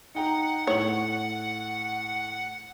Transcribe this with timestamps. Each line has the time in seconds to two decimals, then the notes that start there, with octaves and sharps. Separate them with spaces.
0.15 D#4 F#5 G5 A#5
0.67 A2 C#5 F#7